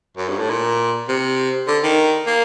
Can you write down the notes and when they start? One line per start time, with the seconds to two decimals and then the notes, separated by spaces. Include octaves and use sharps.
0.17 F#2
0.29 G2
0.39 A2
0.50 A#2
1.09 C3
1.67 D3
1.83 D#3
2.27 A#3